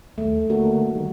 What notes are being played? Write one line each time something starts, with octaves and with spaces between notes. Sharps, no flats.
D#2 A3
D3 A3 A#3 F#4
D#3 G3